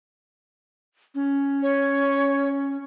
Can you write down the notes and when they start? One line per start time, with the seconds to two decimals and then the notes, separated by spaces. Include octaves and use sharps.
1.15 C#4
1.62 C#5